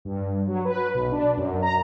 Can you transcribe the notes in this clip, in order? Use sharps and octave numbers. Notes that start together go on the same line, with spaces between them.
G2
F#3
B4
B1
D4
F#2
A#5